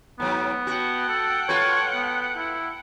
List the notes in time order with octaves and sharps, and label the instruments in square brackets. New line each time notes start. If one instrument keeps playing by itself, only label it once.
[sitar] G#2 F#3 [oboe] B3
[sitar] F#4 [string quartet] F#5 G5 A5
[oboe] A4
[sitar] F4 A4 B4 [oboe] C#5
[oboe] B3
E4